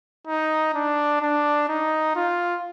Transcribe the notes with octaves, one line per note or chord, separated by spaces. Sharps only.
D#4
D4
D4
D#4
F4